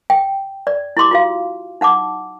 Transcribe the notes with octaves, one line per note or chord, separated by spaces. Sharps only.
G5
D5
E4 G4 C6 D6
F4 F#4 F5
D#4 F#5 A5 D6